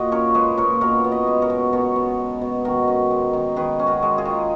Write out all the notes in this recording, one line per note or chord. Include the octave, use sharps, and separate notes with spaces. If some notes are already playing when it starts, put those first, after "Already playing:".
Already playing: A#2 F#4 D#5
C#4 A#4 C#5
G#3 G#4 B4
A#2 A#4 C#5
B2 A#4 C#5
B3
B4 D#5
G#3
A#4 C#5
B2
B2 A#4 C#5
B3
G#3
B2
D#3 F#4 A#4
C#4
G#3
D#3
D#3 G#4 B4
C#4
F#4 A#4
G#3
F4 G#4
D#3